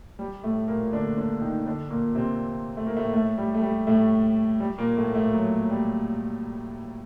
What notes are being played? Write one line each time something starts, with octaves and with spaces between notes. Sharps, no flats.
G3
A2 A3
A#2 A#3
D3 D4
D3 D4
D#3 D#4
D3 D4
A#2 A#3
C3 C4
A3
A#3
A2 A3
A2 A3
G3
A3
G3
A2 A3
G3
A#2 A#3
A2 A3
A2 A3
F#3
G3